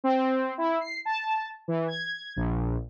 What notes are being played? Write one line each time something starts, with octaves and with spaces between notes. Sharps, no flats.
C4
E4
C7
A5
E3
G#6
A#1